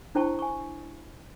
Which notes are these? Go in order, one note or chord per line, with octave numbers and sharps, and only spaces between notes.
D4 E4 C5 G5 A5 C#6
G#5 C#6